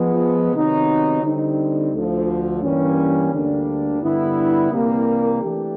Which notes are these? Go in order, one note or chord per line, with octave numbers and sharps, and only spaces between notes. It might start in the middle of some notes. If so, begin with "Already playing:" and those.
Already playing: F3 G#3 B3
C3 D#3 F#3 B3 D#4
D3 G3 C4 D#4
D2 D3 F3
G2 E3 G3 A#3 C#4
D2 D3 G3 A#3 D4
G2 D3 G3 B3 E4
C2 C3 E3 G3 A#3
E3 A3 D4 G4